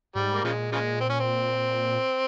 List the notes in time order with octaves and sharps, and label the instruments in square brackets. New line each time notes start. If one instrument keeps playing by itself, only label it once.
[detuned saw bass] G#2 [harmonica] G3
[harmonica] A#3
[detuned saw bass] A#2 [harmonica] C#3 F3 G#3
[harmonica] C#3 F3 G#3
C4
C#4
C4